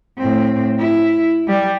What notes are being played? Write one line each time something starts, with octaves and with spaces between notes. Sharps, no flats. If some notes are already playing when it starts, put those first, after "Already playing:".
A2 C4
E4
G3